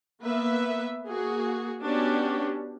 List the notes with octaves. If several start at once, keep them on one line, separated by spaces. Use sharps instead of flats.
A#3 B3 B4 E5
A#3 F#4 G#4
B3 C#4 D4 F#4 G4